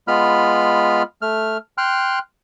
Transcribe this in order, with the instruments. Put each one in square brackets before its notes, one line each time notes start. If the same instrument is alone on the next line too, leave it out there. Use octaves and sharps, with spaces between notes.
[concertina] G#3 B3 F4 B5 F6
A3 F6
G5 C6 F6 F#6